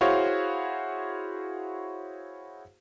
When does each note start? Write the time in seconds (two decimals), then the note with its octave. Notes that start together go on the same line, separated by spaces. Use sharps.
0.01 E4 F#4 G#4 C5 C#5 F5